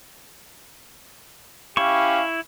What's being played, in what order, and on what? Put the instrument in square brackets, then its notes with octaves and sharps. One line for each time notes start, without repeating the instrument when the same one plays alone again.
[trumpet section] C#4 G4 F5 [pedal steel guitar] E4 C#6